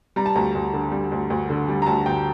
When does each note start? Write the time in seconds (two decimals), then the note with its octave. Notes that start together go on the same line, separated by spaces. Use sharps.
0.16 G3 A#5
0.26 A5
0.35 D2 A#5
0.55 D2
0.73 D3
0.92 G3
1.12 D2
1.30 D2
1.50 D3
1.68 G3
1.82 A#5
1.86 D2 A5
2.06 D2 G5